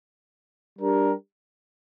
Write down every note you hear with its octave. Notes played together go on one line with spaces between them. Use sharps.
G3 D4 G4 A#4